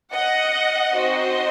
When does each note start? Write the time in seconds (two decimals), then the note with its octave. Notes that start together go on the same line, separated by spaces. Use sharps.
0.13 D#5 F#5
0.94 C4 D#4 F#4 C5 D#5